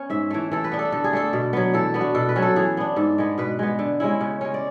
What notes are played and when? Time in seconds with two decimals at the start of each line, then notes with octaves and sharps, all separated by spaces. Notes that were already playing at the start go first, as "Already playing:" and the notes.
Already playing: B3 C#4 C#5
0.10 G#2 E5
0.31 E3 A3
0.52 E3 A4
0.64 B4
0.72 B3 D4
0.79 A4
0.92 D3 A4
1.04 G#4
1.13 A3 D4 A4
1.33 B2
1.53 F#3 B3
1.74 E3 A4
1.94 B3 D4
2.01 F#4
2.15 B2 A4
2.29 B4
2.36 F#3 C#4
2.42 A4
2.56 E3 G#4
2.77 B3 D4
2.96 G#2 A4
3.18 G#3 B3
3.38 B2 B4
3.59 G#3 B3
3.79 D3
4.00 G#3 C#4 E4
4.21 C#3
4.41 G#3 C#4
4.54 D5